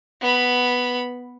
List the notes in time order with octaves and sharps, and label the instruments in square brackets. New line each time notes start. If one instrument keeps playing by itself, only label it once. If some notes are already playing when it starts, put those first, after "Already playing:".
[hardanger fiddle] B3 B5